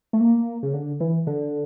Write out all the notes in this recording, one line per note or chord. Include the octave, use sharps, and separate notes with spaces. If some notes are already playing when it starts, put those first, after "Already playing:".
A3
A#3
C#3
D3
E3
D3